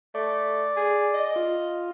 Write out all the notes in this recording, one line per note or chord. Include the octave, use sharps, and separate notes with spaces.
A3 D5
G#4
D#5
F4